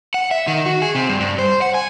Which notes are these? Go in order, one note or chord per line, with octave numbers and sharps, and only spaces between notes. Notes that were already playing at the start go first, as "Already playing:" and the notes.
F#5
E5
D#3
F#4
G#4
C3
G2
G2
C5
F#5
G#5